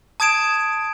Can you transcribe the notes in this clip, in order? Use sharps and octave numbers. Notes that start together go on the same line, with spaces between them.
A5 D#6 G#6 D7 E7